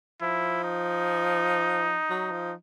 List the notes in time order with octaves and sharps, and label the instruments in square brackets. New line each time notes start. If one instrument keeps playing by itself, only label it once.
[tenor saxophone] F3 [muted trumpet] E4
[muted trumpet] D#4
[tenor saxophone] F#3
F3